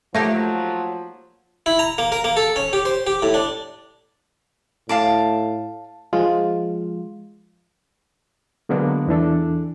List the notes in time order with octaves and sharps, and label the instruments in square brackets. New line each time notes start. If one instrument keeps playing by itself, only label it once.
[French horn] F3 [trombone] F#3 [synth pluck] A3 [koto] A#3 D#4 G4
[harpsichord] E4
A#5
A#3
A#4
A#3
A4
C#4
G4
C5
G4
A2
D4
[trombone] A2 [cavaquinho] F5 A5 D6
[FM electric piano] F3 G#3 F4
[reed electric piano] D3 F#3 G#3 A#3 B3 D4
E2 E3 D4 A4